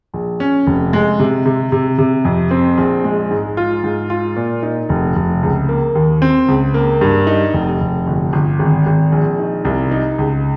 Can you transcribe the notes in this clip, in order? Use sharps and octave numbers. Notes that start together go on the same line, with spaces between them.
A#1
C#4
F1
G#3
C3
C3
C3
C3
F2
C4
A#1
G#3
G#2
F4
G#2
F4
A#2
D#4
F1
F1
C#2
A#3
D#2
C4
C#2
A#3
G2
D#4
F1
F1
G1
G1
G#1
G#1
A#1
D#4
C2
D#4
C#2